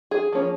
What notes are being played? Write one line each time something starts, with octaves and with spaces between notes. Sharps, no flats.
G#4
F3 A#3 C#4